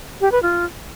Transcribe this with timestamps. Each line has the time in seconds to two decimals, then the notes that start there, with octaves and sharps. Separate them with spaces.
0.21 G4
0.32 B4
0.43 F4